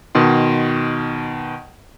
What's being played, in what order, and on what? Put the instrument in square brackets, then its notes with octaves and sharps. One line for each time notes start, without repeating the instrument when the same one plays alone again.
[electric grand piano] B2 D#3 C6